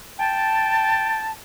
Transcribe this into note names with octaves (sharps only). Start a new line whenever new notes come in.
G5 A5